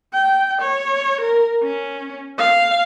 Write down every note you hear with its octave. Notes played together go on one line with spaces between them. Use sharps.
G5
C#5
A#4
C#4
F5